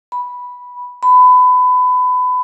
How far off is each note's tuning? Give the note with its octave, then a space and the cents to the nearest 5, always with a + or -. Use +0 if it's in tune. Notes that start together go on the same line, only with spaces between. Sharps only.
B5 -5
B5 +25